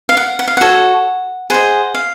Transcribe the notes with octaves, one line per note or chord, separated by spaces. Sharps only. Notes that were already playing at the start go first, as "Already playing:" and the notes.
F5
F#5
F#5
F5
F#4 A4 C#5 F#5
G#4 C5 D#5 F#5
F5